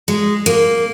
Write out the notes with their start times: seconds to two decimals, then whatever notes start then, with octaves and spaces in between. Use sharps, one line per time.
0.08 G#3
0.46 A#3